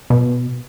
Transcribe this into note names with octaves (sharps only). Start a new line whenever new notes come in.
B2